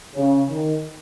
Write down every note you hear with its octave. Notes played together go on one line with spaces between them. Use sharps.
C#3
D#3